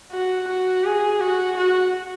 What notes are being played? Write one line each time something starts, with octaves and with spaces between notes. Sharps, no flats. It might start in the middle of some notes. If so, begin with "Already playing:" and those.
F#4
F#4
G#4
F#4
F#4